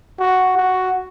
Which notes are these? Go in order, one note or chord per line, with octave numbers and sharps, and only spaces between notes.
F#4
F#4